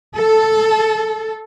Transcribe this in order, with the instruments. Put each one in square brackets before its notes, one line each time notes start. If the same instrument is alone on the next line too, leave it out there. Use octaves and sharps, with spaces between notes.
[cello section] A4